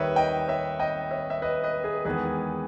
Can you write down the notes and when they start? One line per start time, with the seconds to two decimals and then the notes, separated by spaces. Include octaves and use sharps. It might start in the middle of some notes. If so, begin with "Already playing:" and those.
Already playing: D#2 D#3 G3 B4 C#5 D#5 E5
0.16 D#5 G5
0.48 C#5 E5
0.79 D#5 G5
1.11 C#5 E5
1.30 E5
1.42 B4 D#5
1.64 B4 D#5
1.84 G#4 B4
2.05 E2 D#3 G#3 B3 G#4 B4